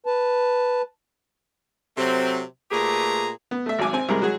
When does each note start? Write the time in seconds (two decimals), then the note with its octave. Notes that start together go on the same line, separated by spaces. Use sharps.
0.06 B4 A5
1.97 C3 F#3 A3 C4
2.71 A#2 A3 G4 G#4 B4 A#5
3.51 B3
3.66 A3 E5
3.79 G#1 F#3 G#5 D6
3.93 C4 G#5
4.09 C2 C3 G#3 A#4
4.22 F#3 G#3 F#4 G#4